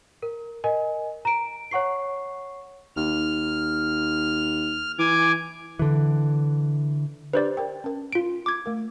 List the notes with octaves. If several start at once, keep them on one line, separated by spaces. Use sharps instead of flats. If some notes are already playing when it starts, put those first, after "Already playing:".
A#4
A#4 D#5 G#5
A#5 D7
C#5 F#5 C#6 C7
D#2 F6
E3 G#5 D6
D3 E3
D4 G4 B4 C5 D5
A#4 G5
C#4 A#4
F4 D7
D6 G#6
A3 A#4